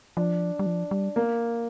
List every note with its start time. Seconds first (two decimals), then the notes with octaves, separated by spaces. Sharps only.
0.17 F3 D4
0.59 G3
0.66 F3
0.91 G3
1.16 A#3